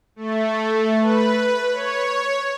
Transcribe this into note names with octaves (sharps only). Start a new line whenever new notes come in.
A3
B4
C#5